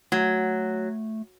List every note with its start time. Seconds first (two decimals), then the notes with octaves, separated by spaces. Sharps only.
0.12 F#3 A3